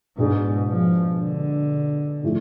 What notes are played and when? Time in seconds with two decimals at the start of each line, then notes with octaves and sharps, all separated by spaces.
0.18 G#2 B2 G#3 D4 G#4
0.69 F3
1.20 D3
2.23 A2 F3 A3